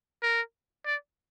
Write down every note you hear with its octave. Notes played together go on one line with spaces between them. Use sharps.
A#4
D5